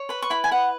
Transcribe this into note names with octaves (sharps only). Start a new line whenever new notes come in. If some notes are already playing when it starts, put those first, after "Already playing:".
Already playing: C#5
B4 B5
C#6
E4 B5
G#5
B4 F#5